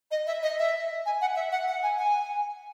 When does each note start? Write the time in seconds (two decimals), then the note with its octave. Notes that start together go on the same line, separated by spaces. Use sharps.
0.11 D#5
0.27 E5
0.43 D#5
0.59 E5
1.06 G#5
1.21 F#5
1.36 E5
1.52 F#5
1.68 F#5
1.83 G#5
1.99 G#5